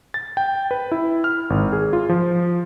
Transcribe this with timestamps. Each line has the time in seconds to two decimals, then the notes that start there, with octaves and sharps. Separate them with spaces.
0.14 A6
0.37 G5
0.71 B4
0.92 E4
1.24 F6
1.50 G#1
1.73 G#4
1.93 F4
2.09 F3